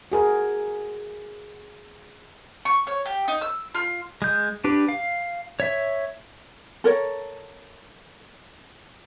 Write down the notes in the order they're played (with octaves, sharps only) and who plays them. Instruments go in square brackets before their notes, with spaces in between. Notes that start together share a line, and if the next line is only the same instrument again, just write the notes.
[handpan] F#4 G#4 A#4
[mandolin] C#6
C#5
G4
D#4
E6
F4
[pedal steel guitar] G#3 G6
D4 G4 B4
F5
C#5 E5
[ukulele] A4 A#4 C#5